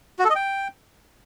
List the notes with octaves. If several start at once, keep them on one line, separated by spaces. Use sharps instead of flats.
F#4
A4
D#5
G5